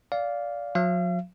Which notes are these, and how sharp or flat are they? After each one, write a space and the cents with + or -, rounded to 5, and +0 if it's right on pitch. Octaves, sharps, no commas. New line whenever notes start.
D5 -20 F5 +5
F#3 -45 F5 -40